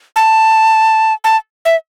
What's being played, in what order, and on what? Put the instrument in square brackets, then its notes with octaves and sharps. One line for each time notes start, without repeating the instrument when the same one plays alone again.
[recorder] A5
A5
E5